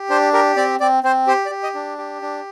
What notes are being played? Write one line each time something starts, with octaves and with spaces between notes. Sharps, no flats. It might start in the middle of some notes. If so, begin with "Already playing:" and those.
Already playing: G4
D4 C5
G4 A#4
C4 D5
C4 D5
C4 C5
G4 C5
D5
G4
D#5
D4
G4
D4